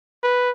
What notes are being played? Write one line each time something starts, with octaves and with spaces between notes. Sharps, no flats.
B4